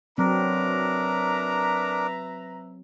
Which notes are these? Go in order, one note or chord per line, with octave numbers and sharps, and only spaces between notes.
F#3 C4 D4 A#4 B4 E5 A#5